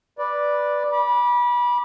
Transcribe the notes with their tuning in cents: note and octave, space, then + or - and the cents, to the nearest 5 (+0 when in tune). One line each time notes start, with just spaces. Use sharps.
B4 -10 D5 +0
B5 -25 D6 +0